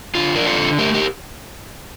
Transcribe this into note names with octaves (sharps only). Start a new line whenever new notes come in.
D3 F4
D4 A#4
F4 A4
D3
A3 G4 A#4
G4 A#4